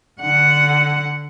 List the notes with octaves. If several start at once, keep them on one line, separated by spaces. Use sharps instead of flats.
D3 F#5